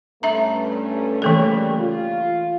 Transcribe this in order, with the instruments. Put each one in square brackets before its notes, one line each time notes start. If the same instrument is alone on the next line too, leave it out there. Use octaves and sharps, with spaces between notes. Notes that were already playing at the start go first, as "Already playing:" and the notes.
[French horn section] G2 A3 C#4 [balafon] E5 A#5
[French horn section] C#3 G3 A#3 [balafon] E3 A3 A4
[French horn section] F4